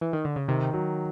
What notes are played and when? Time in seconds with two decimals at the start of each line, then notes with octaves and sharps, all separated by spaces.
0.01 E3
0.13 D#3
0.25 D3
0.36 C#3
0.48 C3 D#3
0.73 F#3